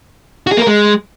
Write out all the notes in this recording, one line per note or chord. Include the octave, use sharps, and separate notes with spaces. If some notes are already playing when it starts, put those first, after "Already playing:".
F#4
G#4
A#3
A#4
G#3